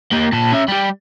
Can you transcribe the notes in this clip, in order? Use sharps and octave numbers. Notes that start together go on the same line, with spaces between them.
A#3 G4
A#2 A5
C#4 E5
G3 G4